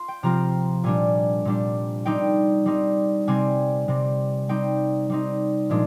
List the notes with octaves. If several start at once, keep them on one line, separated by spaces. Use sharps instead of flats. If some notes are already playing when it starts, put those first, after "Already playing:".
Already playing: F4 C6
G5
C3 F3 C4 F4 A#5
A#2 G3 D4 G#5
A#2 G3 D4
G3 C4 D#4 G5
G3 C4 D#4
C3 G3 C4 G#5
C3 G3 C4
G3 C4 D#4 G5
G3 C4 D#4
A#2 F3 G#3 D4